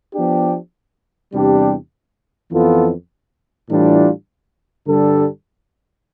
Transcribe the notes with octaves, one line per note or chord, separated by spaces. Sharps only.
F3 B3 D4 G4
E2 C3 G3 D4 G4
F2 E3 B3 F4 A4
A2 E3 G3 D4 F4
G2 D3 G3 D4 A4